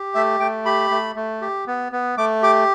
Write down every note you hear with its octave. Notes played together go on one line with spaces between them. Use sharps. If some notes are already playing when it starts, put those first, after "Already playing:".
Already playing: G4
A3 E5
A3 G5
G4 B5
A3
A3
G4
B3
B3
A3 D6
G4 D6